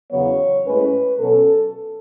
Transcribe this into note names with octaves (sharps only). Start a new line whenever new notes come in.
E2 C#3 F#3 B3 C#5
A2 G#3 C#4 B4
B2 F#3 C#4 A4